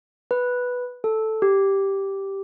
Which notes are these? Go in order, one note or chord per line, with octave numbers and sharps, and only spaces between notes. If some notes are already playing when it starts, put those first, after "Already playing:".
B4
A4
G4